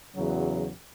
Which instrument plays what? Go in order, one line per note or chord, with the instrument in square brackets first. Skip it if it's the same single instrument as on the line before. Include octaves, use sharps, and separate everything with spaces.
[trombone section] E2 C#3 F#3